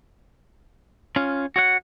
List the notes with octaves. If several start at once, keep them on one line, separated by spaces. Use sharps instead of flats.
C#4 F4
F#4 C#5 F#5